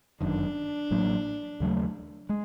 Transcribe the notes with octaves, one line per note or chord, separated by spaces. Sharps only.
G1 F#2 D#3 D4
A1 A2 F#3 A#3
D#2 C#3 F#3 A3
G#3